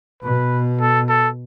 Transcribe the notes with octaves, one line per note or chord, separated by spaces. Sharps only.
B2 B4
A4
A4